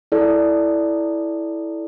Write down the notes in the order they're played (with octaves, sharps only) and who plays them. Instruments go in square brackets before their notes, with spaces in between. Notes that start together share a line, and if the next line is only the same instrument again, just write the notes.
[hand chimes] E4 A4 D5